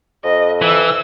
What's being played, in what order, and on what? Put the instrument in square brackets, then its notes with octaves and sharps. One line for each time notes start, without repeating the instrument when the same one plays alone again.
[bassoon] F2 [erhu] D#5
[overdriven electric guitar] E3 [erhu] E6